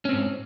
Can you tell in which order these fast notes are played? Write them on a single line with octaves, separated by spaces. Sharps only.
C#4 C4 G#2